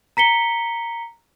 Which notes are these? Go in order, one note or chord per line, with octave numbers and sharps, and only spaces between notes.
A#5 B6 C#7 G7